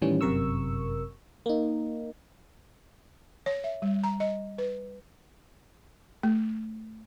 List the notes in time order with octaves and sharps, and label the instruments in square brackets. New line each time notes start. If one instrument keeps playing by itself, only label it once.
[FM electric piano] A2 D#3 E3 G3 C#4
G1 F#2 C3 A#4 C#6 E6
A#3 D#4
[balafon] C#5
E5
G3
A#5
D#5
B4
A3